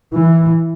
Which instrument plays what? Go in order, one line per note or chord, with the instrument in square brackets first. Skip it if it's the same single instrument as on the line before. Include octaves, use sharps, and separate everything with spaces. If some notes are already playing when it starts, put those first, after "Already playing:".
[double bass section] E3